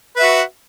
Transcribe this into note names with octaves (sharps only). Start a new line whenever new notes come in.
F#4 B4 E5